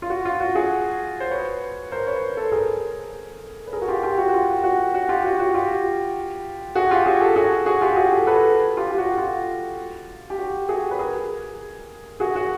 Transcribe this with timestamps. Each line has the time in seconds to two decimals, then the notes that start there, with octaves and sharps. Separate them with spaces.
0.02 F4
0.10 F#4
0.25 F4
0.40 F#4
0.55 F#4 G#4
1.20 C5
1.31 B4 C#5
1.92 A#4 C5
2.07 B4 C#5
2.37 A4 B4
2.52 G#4 A#4
3.67 B4
3.73 G#4 A#4
3.82 F#4
3.88 F4 G4
4.03 F4 G4
4.18 F#4
4.29 F#4
4.34 F4
4.64 F#4
4.94 F#4
5.09 F4 G4
5.24 F#4
5.40 F#4
5.54 F4 G4
6.75 F#4 G#4
6.90 F4 G4
7.06 F#4 G#4
7.21 G4 A4
7.36 F#4 G#4
7.66 F#4 G#4
7.82 F4 G4
7.96 F#4 G#4
8.12 G4 A4
8.27 A4 B4
8.77 F4 G4
8.91 G4
8.98 F#4
9.18 F4
10.30 G4
10.38 F#4
10.69 F#4 G#4
10.91 B4
10.99 G#4 A#4
12.20 F#4 G#4
12.36 F#4